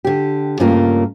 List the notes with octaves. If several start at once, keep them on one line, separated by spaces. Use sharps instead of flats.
D3 G4
G2 C#3 A3 A#3 F4 A#4